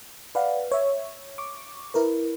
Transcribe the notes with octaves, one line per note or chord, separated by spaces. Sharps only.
B4 D5 F5 F#5
C#5 E5
C#6 D6
E4 A#4 B4